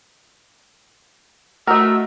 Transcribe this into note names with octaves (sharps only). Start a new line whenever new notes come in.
A3 F#4 A#4 D#5 E6